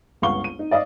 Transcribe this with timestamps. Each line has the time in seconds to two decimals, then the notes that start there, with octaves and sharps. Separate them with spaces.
0.22 G1 C#2 F5 F#5 C#6 G7
0.44 D#7
0.59 D#4
0.71 D5 D#5 F5 D#6